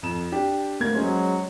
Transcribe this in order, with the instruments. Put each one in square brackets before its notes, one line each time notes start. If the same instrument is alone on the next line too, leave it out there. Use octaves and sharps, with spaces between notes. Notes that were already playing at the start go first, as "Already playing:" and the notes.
[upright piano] F2 E7
D4 G4
D2 A#3 G#6
[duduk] F#3 [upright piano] G#3 C#4 C5